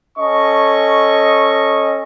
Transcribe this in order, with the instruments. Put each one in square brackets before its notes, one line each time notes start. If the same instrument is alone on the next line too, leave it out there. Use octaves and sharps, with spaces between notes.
[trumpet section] C#4 A4 D#5 C#6